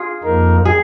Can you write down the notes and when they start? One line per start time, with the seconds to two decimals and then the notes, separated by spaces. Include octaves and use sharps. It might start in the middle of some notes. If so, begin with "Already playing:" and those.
Already playing: F4 G#4
0.23 F2 F3 A#3 D#4 A#4
0.65 G#4